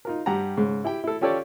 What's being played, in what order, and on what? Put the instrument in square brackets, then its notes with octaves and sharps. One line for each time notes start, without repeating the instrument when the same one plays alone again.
[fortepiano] D#4 F4 A#4
G2 G4 F#5 A#5
G#2 C#3
E4 G4 G5
E4 A4
C#4 F4 G4 A4 C#5 D5